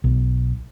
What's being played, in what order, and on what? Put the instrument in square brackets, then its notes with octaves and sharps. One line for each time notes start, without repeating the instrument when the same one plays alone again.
[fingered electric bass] B1